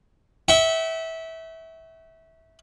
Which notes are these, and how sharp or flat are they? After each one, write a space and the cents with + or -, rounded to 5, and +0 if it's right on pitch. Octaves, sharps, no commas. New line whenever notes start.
E5 -20 G5 -45 C#6 +0